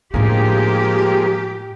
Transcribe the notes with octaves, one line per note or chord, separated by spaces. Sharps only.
A2 F3 G#3 A#3 D4 G4